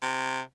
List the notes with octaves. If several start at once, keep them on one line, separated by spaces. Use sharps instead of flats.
C3